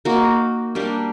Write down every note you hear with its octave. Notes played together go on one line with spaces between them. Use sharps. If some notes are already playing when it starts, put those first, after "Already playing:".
A#3 D#4 F#4
G3 A#3 D4 G4